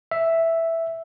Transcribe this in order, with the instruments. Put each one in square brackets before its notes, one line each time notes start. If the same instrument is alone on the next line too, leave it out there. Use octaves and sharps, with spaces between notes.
[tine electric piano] E5